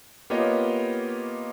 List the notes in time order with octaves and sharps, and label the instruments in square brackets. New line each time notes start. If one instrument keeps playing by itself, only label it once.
[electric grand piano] A#3 B3 F4 G4 C#5 D#5